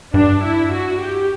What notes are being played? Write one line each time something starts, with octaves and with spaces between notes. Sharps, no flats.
G2 D4
E4
F#4
G4